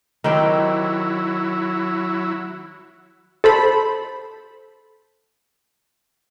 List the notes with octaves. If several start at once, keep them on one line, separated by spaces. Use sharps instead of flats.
D#3 F#3 C4 E4 G4
A4 C5 B5